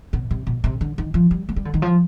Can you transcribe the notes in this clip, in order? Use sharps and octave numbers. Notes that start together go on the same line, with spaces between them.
B2
C3
B2
C3
D3
D#3
F3
G3
A3
G3
D3
D#3
F3